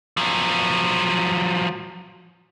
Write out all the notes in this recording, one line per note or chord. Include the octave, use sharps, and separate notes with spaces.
F3 F#3